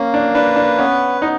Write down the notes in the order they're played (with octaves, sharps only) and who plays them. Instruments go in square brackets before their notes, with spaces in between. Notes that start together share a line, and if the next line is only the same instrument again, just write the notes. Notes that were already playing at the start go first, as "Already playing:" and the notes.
Already playing: [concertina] A#3 [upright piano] C#4
[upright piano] D4
[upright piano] D4 [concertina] B4
[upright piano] D4
[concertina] B3 [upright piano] C#4
[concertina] B3 [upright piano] D#4